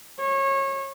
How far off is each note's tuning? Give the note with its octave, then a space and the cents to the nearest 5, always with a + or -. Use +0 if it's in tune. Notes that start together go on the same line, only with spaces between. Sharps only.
C#5 -25